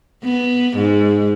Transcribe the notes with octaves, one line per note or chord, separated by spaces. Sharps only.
B3
G#2